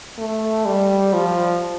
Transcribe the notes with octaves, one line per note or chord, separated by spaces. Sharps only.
A3
G3
F3